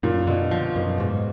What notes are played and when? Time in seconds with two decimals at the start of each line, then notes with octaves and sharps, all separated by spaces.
0.03 F#2 A#2
0.27 B2 D3
0.51 F3
0.76 F#2 B2
1.00 G#2 B2